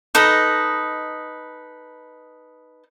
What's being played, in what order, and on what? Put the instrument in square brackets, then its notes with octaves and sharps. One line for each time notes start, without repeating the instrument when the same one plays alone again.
[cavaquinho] D#4 A4 B4 D#5